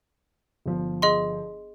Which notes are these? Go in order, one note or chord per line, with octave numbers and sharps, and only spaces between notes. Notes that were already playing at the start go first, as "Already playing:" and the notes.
G1 F3
G#4 D#5 C6